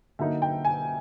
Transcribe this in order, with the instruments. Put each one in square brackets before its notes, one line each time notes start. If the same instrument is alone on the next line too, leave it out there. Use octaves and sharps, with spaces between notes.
[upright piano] D3 F#3 A#3 D#4 E5
G5
G#5